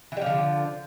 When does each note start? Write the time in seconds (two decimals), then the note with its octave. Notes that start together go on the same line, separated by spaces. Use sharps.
0.12 E3
0.17 G3
0.22 F3
0.26 D3